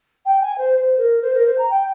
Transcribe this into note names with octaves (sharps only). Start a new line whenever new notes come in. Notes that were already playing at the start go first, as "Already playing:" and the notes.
G5
G#5
C5
C5
A#4
C5
A#4
C5
A#5
G5